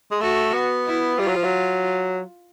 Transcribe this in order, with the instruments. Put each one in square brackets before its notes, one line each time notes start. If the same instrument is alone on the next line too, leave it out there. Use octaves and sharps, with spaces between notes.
[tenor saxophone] G#3
[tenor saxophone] A3 [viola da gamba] F#4
[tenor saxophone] B3
[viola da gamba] E4
[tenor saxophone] G3 [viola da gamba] F4
[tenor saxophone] F#3
F3
F#3